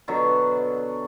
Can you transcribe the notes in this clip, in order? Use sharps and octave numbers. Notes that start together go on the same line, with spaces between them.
B2 D3 F#3